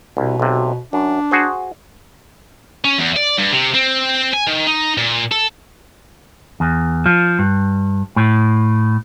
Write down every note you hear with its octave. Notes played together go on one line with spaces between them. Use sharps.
C2 B2
B1 C3
F#2 D4
F#4 G#4 C5
C#4
E2
D5
G2
C3
C4
G#5
D#3
D#4
A#2
A4
E2
F3
G2
A2